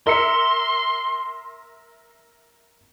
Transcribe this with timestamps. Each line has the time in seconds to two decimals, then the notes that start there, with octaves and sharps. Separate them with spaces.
0.07 A#4 E5 C6 C#7